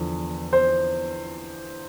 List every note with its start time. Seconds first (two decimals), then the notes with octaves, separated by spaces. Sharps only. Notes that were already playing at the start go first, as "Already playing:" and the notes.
Already playing: E2 D3 F3
0.53 C5